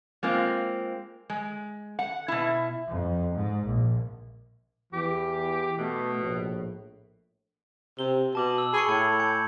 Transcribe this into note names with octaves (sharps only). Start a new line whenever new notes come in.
G#3 A#3 C4 F4
G#3
F#5
B2 E4
F2
G#2
A#1
E2 E3 G4
B2 A3 B3
A#1 A2
C3 G7
B2 A5 D6 F#7
E6
G#4 B5 C#6 C#7
A2 G#6 C#7
G#5 G6 C#7